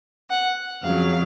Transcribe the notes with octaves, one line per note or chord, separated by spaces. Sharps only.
F#5
F2 C#3 F#3 F5